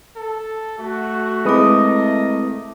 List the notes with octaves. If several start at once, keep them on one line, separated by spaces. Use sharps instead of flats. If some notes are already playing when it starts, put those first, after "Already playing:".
A4
A3 F#4
G#3 C4 E4 A#4 B4 D#5 D6 D#6